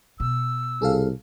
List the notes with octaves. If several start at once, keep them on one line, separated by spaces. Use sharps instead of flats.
B2 E6
C2 G#4 A4 F5